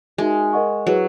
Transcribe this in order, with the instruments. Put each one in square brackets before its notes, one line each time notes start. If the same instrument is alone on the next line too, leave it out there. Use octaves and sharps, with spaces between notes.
[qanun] G#3 [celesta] D#4 F#4 A#4 E5 G#5
[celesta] A#4 D#5 F#5 C#6
[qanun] F#3 [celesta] E4 G#4 B4